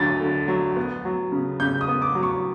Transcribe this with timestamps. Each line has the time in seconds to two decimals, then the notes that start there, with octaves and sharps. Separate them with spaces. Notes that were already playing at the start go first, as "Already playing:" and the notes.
Already playing: D2 F#3 A6
0.21 D3
0.48 F#3
0.76 B3
1.05 F#3
1.32 C#3
1.60 C#3 G6
1.81 D#6
1.88 B3
2.02 D6
2.15 F#3
2.23 C#6